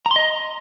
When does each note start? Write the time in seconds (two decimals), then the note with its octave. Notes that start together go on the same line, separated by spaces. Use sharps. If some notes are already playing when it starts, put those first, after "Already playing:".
0.06 A#5
0.11 C6
0.16 D#5